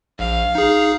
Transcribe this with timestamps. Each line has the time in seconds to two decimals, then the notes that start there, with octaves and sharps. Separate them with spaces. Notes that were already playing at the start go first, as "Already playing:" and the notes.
0.19 A#1 F5
0.55 D#4 G#4